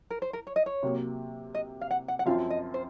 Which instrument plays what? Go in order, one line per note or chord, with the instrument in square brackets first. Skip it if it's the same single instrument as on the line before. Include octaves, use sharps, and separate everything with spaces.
[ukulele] A#4
C5
A#4
C#5
D#5
C#5
[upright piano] C3 F#3 A#3
[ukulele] D#5
F5
F#5
F#5
F#5
[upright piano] F#2 F3 C4 F4 [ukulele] F5
[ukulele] D#5
C5